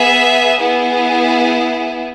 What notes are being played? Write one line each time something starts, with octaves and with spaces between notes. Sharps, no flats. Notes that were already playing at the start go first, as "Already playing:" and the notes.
Already playing: B3 G#4 E5
B3 E4 G#4